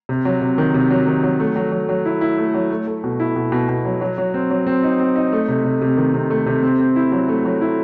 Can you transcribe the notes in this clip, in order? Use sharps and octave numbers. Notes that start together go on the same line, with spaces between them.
C3
F#3
C3
D#3
C3
F#3
D#3
F#3
A3
F#3
F#3
F#3
E4
E4
A3
F#3
A3
A3
B2
E4
B2
B2
B2
F#3
F#3
F#3
C4
F#3
C4
D#4
C4
D#4
A3
C3
C3
C3
D#3
C3
A3
C3
C4
C4
E4
F#3
A3
F#3
E4